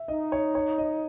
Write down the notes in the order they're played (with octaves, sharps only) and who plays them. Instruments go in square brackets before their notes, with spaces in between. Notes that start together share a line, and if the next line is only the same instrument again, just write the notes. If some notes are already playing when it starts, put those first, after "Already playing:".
Already playing: [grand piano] E5
[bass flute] D#4 [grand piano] D#5
[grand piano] C#5
C#5
D#5